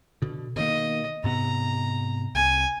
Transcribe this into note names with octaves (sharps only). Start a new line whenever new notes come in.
B2 D3
B2 D#3 A#3 D#5
G#2 C3 B3 A#5
C2 G#5